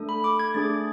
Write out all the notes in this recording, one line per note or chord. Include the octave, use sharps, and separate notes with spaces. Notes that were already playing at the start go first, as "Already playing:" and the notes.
Already playing: A3 D4 A4
B5
D6
G#6
A3 D4 G#4 A6